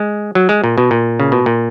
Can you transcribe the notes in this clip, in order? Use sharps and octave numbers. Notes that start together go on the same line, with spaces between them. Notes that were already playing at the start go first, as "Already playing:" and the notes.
Already playing: G#3
F#3
G#3
A#2
B2
A#2
C#3
B2
A#2